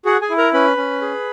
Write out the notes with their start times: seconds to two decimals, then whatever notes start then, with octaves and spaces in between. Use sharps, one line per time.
0.05 F#4 G#4 F#5
0.22 G#4 G#5
0.30 E4
0.38 A#4 A#5
0.53 C#4 B4 B5
0.77 C#4
1.01 G#4